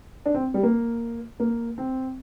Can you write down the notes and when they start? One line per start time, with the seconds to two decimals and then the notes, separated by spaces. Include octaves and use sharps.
0.26 D4
0.34 C4
0.54 G3
0.63 A#3
1.40 A#3
1.78 C4